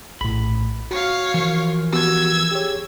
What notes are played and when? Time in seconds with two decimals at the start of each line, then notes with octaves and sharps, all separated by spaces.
0.21 A#1 A2 B5
0.91 F#4 C#5 F5
1.34 E3 F3 A#4
1.92 B3 F#4 G4 E6 G#6
2.51 G4 G#4 C#5